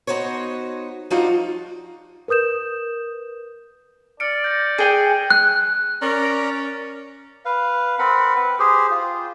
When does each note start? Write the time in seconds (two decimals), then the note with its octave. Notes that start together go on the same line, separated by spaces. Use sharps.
0.07 B3 D#4 F#4 C5 C#5
1.10 F3 G3 D4 D#4 F4 F#4
2.28 A#4 B4 D#6 G6 E7
4.20 D5 F6 C#7 D7
4.44 G6 A#6
4.78 G#4 G5 G#5
5.30 F#6
6.02 C#4 A#4 D5 A#5
7.45 B4 F5
7.99 C4 A#4 F#5 B5
8.35 B4
8.59 G4 G#4 C5
8.91 F4